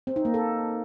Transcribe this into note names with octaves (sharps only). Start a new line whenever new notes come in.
C4
D#4
A#3
A4